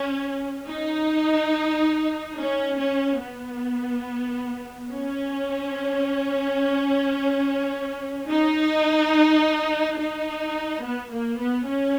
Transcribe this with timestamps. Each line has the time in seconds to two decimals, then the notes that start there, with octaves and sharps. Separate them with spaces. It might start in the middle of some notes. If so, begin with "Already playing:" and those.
Already playing: C#4
0.68 D#4
2.37 C#4
2.78 C#4
3.21 B3
4.91 C#4
8.29 D#4
9.98 D#4
10.83 B3
11.12 A#3
11.39 B3
11.67 C#4